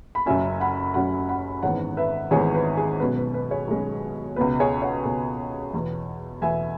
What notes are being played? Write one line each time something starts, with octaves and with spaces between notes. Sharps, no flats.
B5
F#1 F#2 F#3 C#4 E5 G#5
F#5 B5
F#1 F#2 F#3 C#4 F#5 B5
F#5 B5
G#1 G#2 E3 B3 C#5 F#5
B4 E5
G#1 G#2 E3 B3 G#4 C#5
B4
G#4
B1 B2 G#3 C#4 B4
B4
B4
G#4 C#5
B1 B2 G#3 C#4
C#2 B2 B3 B4
G#4 C#5
C#5 F#5
C#2 B2 B3
E2 B2 B3
E2 B2 B3 E5 G#5